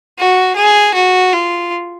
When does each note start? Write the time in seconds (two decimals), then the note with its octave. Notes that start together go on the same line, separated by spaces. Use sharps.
0.19 F#4
0.56 G#4
0.94 F#4
1.33 F4